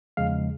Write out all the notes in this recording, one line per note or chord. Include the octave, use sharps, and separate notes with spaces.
E2 C#3 F3 G#3 F5